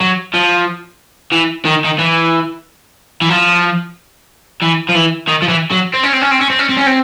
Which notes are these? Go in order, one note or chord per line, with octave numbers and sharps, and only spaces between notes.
F#3
F3
E3
D#3
D#3
E3
E3
F3
E3
F3
E3
D#3
F3
E3
F#3
C4
C#4
C4
C#4
C4
C#4
C4
C#4
C4
C#4
C4